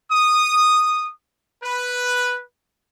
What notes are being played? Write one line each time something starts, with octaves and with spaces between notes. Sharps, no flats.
D#6
B4